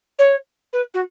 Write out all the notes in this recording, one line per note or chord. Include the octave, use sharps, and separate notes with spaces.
C#5
B4
F#4